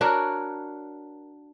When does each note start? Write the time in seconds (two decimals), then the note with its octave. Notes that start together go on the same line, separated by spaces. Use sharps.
0.01 D4 F#4 A#4 C#5